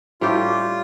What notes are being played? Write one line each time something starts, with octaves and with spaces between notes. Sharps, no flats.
A2 G3 D4 F4 G4